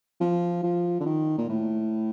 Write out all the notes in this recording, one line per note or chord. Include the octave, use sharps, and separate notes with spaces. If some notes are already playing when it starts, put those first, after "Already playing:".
F3
F3
D3
D#3
A#2
A2